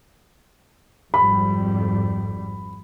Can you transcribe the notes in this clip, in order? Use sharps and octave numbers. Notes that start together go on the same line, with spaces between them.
G#1 F2 G3 B5